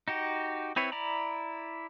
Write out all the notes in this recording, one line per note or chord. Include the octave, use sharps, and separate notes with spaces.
D#4 F#4 G4
C4 E4 B4 C#5
E4 D5 A#5 B5